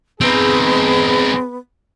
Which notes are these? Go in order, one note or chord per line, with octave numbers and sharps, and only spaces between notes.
B3 C4 D#4 G#4